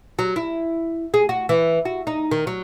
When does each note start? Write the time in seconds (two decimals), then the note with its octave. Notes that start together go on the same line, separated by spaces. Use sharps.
0.19 F#3
0.36 E4
1.14 G#4
1.29 F#4
1.49 E3
1.85 F#4
2.07 D#4
2.31 D#3
2.47 F#3